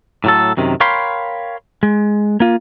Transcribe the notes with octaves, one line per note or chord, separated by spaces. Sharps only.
A2 F#3 A4
F#2 C3 D#3
A#4 C#5 F5 G5 B5 C6
G#3
A#3 F4